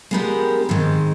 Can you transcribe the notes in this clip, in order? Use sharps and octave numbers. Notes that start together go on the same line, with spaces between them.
G#3 B3 D4 G4 A#4
G#2 D#3 G#3 C4